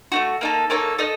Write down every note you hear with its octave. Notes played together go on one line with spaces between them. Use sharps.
A3 D#4 F#4
A#3 D#4 A4
A#3 D#4 A4 C#5
D#4 A4 D#5